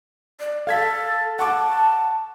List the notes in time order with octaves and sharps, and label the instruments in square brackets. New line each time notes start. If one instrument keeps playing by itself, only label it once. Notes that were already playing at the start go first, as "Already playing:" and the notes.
[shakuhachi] D5
[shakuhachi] A4 [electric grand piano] F5 G#6 B6
[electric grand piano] F#5 C#6 D6 [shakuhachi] A5